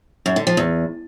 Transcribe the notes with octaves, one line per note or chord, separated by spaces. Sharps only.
F#2
D3
F3
E2